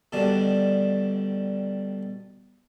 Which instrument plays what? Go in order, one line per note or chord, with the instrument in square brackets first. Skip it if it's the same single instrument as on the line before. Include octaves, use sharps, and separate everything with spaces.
[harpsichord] B2 D3 D#3 G3 D4